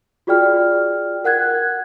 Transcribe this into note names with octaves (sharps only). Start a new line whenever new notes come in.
F4 F#4 G#4 D5 G5 F6
A#4 F#5 F#6 G#6